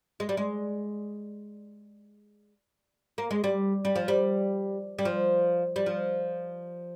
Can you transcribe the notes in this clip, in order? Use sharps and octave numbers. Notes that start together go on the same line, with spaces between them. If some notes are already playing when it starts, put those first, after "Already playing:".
G#3
G3
G#3
A#3
G#3
G3
G3
F3
G3
G3
F3
G3
F3